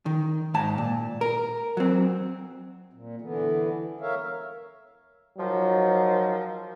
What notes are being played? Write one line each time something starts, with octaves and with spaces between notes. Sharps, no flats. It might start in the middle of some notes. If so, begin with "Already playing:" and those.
D#3
G#2 A5
A#2
A#4
F#3 C4
A#2
D3 E3 B3
A#4 C#5 E5 F5
G#2 D#3 F3 F#3